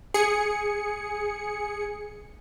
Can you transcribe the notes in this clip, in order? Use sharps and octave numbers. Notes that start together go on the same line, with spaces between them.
G#4 C#7